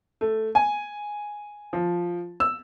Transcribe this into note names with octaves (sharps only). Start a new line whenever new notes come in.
A3
G#5
F3
E6